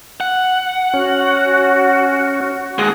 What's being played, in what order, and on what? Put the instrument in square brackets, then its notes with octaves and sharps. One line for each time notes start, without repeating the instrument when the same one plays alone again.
[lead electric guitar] F#5
[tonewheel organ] C#4 [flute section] F#4
[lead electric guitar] D#2 G#3 [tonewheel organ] G#4 F#5